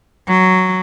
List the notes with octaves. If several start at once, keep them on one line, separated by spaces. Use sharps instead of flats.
F#3